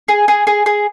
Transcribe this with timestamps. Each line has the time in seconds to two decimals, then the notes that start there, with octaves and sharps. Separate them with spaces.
0.08 G#4
0.28 G#4
0.47 G#4
0.66 G#4